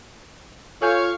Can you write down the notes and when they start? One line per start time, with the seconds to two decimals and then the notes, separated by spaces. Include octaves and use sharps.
0.82 F4 A4 C#5 F5 G#5 C#6 G6